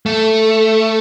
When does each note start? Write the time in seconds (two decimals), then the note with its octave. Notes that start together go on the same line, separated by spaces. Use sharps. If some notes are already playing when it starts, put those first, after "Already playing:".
0.06 A3